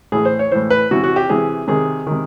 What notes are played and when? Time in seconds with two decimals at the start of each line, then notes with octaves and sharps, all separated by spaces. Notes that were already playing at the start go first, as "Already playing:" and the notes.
0.12 A2 E3 G#4
0.25 C5
0.39 C#5
0.52 A2 E3 C5
0.70 B4
0.91 C3 E3 F#4
1.04 F#4
1.16 G4
1.30 C3 E3 G#4
1.68 C3 D#3 G#4
2.07 C3 D#3